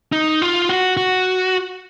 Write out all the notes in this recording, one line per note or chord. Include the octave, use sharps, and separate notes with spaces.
D#4
F4
F#4
F#4